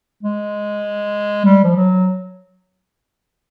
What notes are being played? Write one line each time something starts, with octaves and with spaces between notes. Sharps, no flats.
G#3
G3
F3
F#3